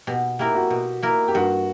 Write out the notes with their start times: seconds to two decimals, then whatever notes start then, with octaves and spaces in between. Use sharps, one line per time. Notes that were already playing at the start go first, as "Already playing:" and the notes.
0.07 B2 G4
0.39 A#3 E4 G4 A#4
0.55 F#4
0.70 B2
1.03 A#3 E4 A#4
1.28 G4
1.35 G2 F#4